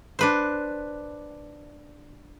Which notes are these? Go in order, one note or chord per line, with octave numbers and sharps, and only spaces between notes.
D4 B4 C5